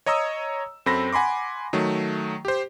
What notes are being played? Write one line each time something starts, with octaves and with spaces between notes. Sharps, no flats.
C#5 D#5 A#5 D#6 E6
F#2 C4 A4 B5 A#6
F#5 G#5 B5 C6 D6
D#3 F#3 A3
G4 C5